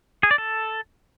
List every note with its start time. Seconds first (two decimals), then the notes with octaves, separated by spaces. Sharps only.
0.23 G#4
0.31 D5
0.38 A4